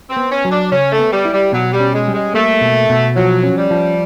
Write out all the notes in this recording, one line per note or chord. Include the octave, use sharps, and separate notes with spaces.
C4
B3
C#4
F#3
D4
C#3 C#4
A3
B3
G3
E4
G3
B2 F#3
G3
C#4
G#3
G3
G#3
A3 A#3
B2
B2
F3 F#3
C#4
G3
F3